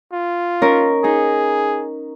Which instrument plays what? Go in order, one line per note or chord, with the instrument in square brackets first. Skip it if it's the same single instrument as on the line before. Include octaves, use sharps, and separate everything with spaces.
[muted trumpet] F4
[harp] C#4 D#4 A#4
[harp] D#4 [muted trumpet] G#4